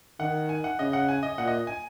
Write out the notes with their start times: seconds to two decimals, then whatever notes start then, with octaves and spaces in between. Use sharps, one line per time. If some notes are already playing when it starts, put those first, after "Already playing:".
0.20 D#3 F#5
0.49 G#5
0.64 F#5
0.79 C#3 D#5
0.93 F#5
1.09 G#5
1.23 D#5
1.38 A#2 F#5
1.48 D#5
1.67 G#5